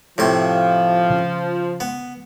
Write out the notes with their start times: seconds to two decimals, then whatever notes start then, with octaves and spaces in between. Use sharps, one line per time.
0.18 A2 C3 F3 C6
1.10 C#3
1.80 B3